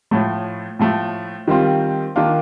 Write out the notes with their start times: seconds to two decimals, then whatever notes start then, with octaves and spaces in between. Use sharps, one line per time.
0.11 A2 F3 A3
0.79 A2 F3 A3
1.48 D#3 G3 C4 F4
2.16 D#3 A#3 D4 F4